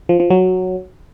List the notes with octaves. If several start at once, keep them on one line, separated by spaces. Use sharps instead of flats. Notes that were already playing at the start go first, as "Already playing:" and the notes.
F3
F3
F#3